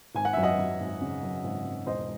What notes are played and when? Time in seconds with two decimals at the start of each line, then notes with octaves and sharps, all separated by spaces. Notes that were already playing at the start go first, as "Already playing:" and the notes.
0.15 G#1 G#5
0.25 F#5
0.33 F#2 E5
0.43 D#5 F#5
0.58 F#2
0.80 G#1
1.01 C#3
1.23 F#2
1.44 G#1
1.64 G#1
1.86 E1 C5 D#5